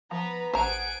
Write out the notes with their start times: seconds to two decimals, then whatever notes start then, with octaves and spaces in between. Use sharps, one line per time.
0.11 F3 B3 B4 A#5
0.54 A1 G#4 C5 F#5 G#5 A#5 D7